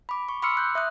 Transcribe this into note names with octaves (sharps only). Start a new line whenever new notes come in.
B5 D6
C#6
B5 C6 D6 E6 F6 C#7
F#6 G6
E5 D#6 F#6